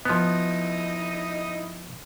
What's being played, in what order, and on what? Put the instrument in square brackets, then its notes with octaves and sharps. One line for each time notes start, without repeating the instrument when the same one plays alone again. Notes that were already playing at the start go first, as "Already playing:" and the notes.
[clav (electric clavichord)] F3 B3 [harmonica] D#4 E4 D#5